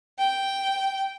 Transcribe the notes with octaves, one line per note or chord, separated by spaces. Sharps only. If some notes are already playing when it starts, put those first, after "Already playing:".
G5